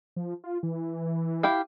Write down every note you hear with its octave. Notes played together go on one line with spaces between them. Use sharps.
F3
F4
E3
E4 G4 F5